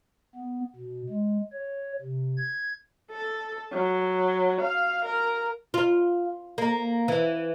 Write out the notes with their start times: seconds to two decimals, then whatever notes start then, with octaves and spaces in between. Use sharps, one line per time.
0.35 B3
0.76 B2
1.10 G#3
1.53 C#5
2.02 C3
2.37 G#6
3.11 A4
3.71 F#3
4.61 F5
5.05 A#4
5.74 F4
6.58 A#3
7.08 E3